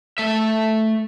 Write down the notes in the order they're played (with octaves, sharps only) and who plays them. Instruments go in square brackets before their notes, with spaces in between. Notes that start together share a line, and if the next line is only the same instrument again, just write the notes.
[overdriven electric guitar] A3 E5